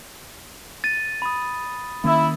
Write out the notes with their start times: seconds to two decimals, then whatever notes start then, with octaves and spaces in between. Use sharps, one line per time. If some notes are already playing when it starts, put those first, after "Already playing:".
0.84 A6 D#7
1.22 B5 D#6
2.04 D#3 A#3 C#4 E4